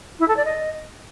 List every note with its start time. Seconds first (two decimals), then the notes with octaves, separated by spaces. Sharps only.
0.20 E4
0.28 A4
0.37 D5
0.45 D#5